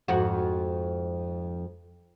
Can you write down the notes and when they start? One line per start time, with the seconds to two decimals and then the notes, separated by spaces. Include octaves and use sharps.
0.08 F2 G#2 F#4